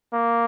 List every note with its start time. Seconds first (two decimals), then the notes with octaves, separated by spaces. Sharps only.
0.13 A#3